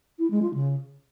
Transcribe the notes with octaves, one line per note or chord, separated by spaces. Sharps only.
E4
G#3
F4
C#3